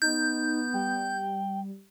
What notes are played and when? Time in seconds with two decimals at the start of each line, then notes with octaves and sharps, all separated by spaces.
0.02 B3 D#4 G6
0.74 G3 G5